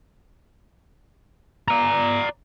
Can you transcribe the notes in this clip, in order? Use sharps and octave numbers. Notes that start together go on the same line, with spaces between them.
D5 A#5